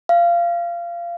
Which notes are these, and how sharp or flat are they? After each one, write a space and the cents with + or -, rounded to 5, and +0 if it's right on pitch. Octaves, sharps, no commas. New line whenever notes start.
F5 -20